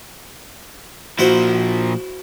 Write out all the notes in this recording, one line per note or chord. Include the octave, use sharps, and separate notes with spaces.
A#2 F3 E4 F#4 C5